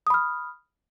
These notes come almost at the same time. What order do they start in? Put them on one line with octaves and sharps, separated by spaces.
D#6 B5 F6